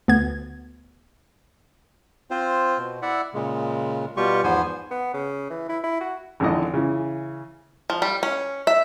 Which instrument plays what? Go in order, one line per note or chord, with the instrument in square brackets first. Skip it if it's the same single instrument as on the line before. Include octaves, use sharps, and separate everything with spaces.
[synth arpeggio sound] D2 B3 G#6
[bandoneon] C4 F4 C5
B2
E4 D5 E5 F#5
A#2 C#3 G#3
B2 G3 F4 G4 C#6
E2 G#2 F3 B3 C5 G#5
[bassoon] B3
C#3
E3
E4
E4
F#4
[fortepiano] G#1 F2 D3 E3 D#5
C#3 E3
[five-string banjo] F3
G3
C#4
E5